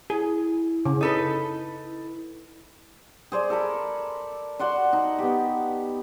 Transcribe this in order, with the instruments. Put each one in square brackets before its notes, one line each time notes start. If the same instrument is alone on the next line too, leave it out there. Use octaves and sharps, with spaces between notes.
[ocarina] E4 [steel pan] G#4
[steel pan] C#3
[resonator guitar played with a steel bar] D#4 A4 B4
[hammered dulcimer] G#4 C5 D5
A4 A#4 B5
F#4 D5 F#5 C6
D#4
B3 G4